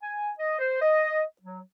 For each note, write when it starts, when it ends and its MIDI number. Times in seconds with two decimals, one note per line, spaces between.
0.02 0.29 80
0.39 0.57 75
0.59 0.80 72
0.81 1.23 75
1.42 1.60 54